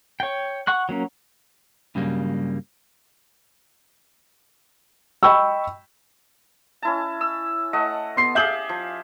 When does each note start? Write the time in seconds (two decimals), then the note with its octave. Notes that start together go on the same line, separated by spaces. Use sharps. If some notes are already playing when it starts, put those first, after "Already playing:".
0.20 C#5 G5
0.67 F#5 C#6 F#6
0.89 F#3 A#3 C#4
1.95 G2 C#3 F#3 G3 A#3
5.23 D#5 G5 B5 C#6 E6
6.82 C#4 E4 A5
7.21 E6
7.73 A3 D#5 F#5
8.16 B3 C6 C7
8.35 G4 G#4 E5 F5 G6 F#7
8.69 F3